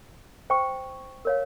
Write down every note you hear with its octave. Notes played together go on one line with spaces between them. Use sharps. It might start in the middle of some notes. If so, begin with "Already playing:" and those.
C5 G5 C#6
A#4 C#5 F5